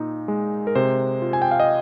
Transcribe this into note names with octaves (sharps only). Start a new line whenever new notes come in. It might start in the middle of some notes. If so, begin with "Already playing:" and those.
Already playing: A#2 D#4
G#3
A#4
C3 C5
F4
G#5
G5
F5
D#5